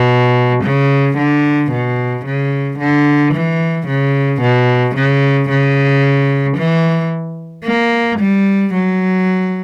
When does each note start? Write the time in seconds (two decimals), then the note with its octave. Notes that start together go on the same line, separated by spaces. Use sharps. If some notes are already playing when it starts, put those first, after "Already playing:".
Already playing: B2
0.64 C#3
1.17 D3
1.71 B2
2.26 C#3
2.79 D3
3.33 E3
3.87 C#3
4.41 B2
4.95 C#3
5.49 C#3
6.57 E3
7.65 A#3
8.19 G3
8.73 F#3